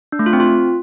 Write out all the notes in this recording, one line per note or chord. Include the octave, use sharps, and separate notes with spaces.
D4
A3
F4
C4
F4